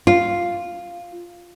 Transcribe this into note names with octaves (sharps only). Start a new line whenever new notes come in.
F4